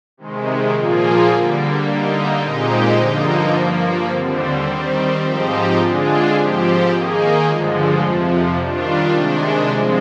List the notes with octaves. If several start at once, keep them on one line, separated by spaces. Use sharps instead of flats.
C3 D#3 G#3
A#2 F3 A#3 F4 G#4
D3 G3 A#3
D3 G3 A#3 D#4
A#2 G#3 C4 D#4 G4
G2 D3 F3 A#3 D#4
G2 F3 A#3
D#2 D3 G3 C4
D#3 G3 C4
G#2 F3 C4 D#4 G4
D3 G#3 D4 F4 G#4
G#2 F3 C4 G4
D#3 A#3 D#4 G#4
G2 D3 F3 G#3
F2 C3 F3
D#3 G3 D4 F4
C3 D#3 G#3 D4
G2 F3 G#3 C4